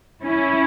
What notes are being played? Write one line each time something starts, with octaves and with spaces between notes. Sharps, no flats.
C#4 E4